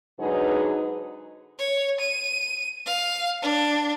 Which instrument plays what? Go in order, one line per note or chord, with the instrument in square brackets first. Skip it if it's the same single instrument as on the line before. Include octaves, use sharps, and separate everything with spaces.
[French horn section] G#2 D3 F#3 D#4 G#4 B4
[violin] C#5
D#7
F5
D4